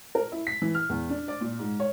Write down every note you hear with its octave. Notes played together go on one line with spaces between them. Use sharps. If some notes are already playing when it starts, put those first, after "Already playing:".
A#4
E4
B6
E3
F6
E2
D4
D5
A#2
G#2
C#5